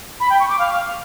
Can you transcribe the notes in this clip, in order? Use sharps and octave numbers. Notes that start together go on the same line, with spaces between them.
B5
G5
C#6
D6
F5